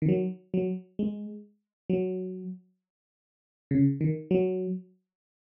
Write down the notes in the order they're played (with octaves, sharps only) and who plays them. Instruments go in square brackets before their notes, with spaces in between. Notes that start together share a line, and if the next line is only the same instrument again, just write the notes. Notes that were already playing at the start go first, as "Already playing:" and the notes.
[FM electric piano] D#3
F#3
F#3
G#3
F#3
C#3
D#3
F#3